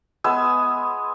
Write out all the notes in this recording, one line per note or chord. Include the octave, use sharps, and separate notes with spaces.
G#3 B3 G#5 E6